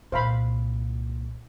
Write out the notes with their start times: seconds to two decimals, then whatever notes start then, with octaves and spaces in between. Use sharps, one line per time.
0.12 C2 A#2 C5 F5 B5